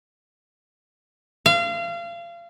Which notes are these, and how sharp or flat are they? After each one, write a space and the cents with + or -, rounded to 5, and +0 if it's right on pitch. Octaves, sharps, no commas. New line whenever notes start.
F5 -30